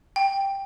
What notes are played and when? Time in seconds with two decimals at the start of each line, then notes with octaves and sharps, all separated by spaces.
0.16 G5